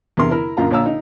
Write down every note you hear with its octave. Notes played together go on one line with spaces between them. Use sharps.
E2 G2 C3 A#4 C6
E4 A#4
A#1 F#2 F4 A#5
A#1 A#2 C#5 F5 A#5 E6
D#4